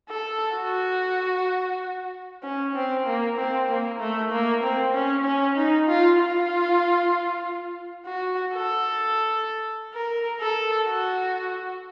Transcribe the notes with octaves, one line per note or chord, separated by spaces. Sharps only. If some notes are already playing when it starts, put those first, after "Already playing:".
A4
F#4
C#4
C4
A#3
C4
A#3
A3
A#3
C4
C#4
C#4
D#4
F4
F4
F#4
A4
A#4
A4
F#4